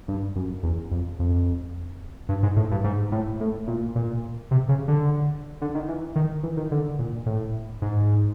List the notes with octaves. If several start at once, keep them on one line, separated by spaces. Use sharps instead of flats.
G2
F#2
E2
F2
F2
G2
G#2
A2
G2
G#2
A2
A2
A#2
A#2
C3
C#3
D3
D3
D#3
E3
D#3
E3
D#3
D3
A#2
A2
G#2